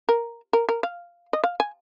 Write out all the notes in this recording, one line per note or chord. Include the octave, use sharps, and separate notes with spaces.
A#4
A#4
A#4
F5
D#5
F5
G#5